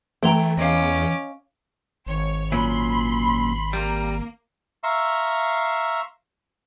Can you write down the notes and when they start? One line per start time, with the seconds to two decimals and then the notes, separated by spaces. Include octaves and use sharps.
0.23 E3 A3 G5 A#5 C6 D7
0.57 E2 C#4 D#5 F5 D6
2.07 G#1 C#5
2.52 A#2 F#3 C#4 B5 C6
3.73 G3 A#3
4.83 E5 F5 A#5 C6 C#6 E6